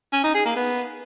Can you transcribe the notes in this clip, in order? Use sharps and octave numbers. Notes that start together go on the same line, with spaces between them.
C#4
D#4
G#4
A#3
B3